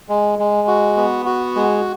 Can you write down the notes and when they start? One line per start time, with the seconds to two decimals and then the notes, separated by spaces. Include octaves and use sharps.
0.09 G#3
0.39 G#3
0.68 F#4
0.97 B3
1.26 F#4
1.56 G#3